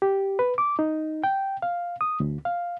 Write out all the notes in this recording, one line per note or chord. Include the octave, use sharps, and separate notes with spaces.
G4
B4
D6
D#4
G5
F5
D#6
D2
F5